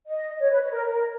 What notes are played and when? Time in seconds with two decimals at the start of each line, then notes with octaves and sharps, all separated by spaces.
0.07 D#5
0.40 C#5
0.50 B4
0.62 C#5
0.72 A#4
0.89 A#4